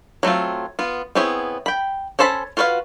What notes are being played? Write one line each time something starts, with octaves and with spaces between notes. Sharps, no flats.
F#3 A3 C4 F4
B3 F4
B3 C4 E4 G#4 C#5
G5 B5
C#4 A4 C5 A5 B5
F4 F#4 B4 C#5 F5